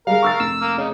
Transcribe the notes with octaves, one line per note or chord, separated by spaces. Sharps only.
G3 G#3 A#4 F5
C#6 E6 A6
F1 E6
A#3
C#3 D#4